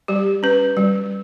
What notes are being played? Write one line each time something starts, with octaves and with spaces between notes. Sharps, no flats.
G3 G4
C#4 B4
G3